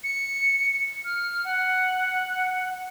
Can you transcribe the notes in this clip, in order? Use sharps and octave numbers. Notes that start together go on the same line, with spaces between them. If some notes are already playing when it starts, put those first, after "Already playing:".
C#7
F6
F#5